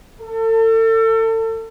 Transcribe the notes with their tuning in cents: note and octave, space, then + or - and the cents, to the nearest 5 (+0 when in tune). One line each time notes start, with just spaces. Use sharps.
A4 +35